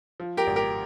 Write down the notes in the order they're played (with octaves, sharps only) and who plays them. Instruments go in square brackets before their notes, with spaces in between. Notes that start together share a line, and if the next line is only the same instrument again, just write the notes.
[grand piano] F3
G4 A#4
G#1
G4 A#4